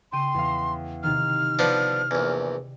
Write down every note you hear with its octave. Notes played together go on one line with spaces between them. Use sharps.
C#3 G5 C6 D#7
E2 F5
C3 D#3 F6
F3 B3 D4 D5
A#1 E2